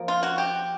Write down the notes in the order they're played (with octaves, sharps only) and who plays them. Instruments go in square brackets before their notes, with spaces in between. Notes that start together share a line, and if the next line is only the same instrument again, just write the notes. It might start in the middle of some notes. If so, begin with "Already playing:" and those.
Already playing: [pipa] F3 A#3
F4
F#4
G4